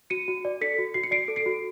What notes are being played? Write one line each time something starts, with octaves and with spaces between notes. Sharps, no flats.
F#4 C#7 D#7
F#4
D5
A4 B6 C#7
F#4
F#4 C7
C#7
D5 C7 D7
A4
C7 D7
F#4